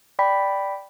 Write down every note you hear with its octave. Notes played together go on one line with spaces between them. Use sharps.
D5 G5 B5 B6